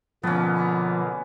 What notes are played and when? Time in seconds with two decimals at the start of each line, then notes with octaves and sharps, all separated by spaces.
0.23 B2 D3 F3 A#3 B3 C#4